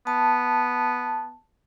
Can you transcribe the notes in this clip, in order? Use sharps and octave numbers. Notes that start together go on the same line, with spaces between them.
B3 A5